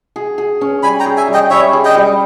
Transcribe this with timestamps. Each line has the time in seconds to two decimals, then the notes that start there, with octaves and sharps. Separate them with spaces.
0.16 G#4
0.38 G#4
0.61 C#4
0.83 G3 G#5 B5
1.00 G5 A#5
1.06 G#4
1.17 E5 G#5
1.28 G3
1.33 D#5 G5
1.50 G3 C#5 E5
1.73 G#4
1.85 D#5 G5
1.95 G3